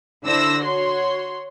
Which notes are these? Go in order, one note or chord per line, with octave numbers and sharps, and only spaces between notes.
D3 D4 E4 C5 E6 A#6
F#4 C#5 C6